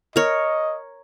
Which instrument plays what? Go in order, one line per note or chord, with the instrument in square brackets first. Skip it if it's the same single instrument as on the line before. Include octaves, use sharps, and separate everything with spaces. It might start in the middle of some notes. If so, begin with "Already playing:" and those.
[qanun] A#4 C#5 [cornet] D#5